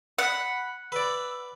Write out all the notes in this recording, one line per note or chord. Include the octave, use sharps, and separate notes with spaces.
F#5 B5
B4 D5 E6